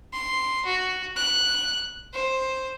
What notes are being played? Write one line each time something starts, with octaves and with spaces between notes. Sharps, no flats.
C6
F#4
F#6
C5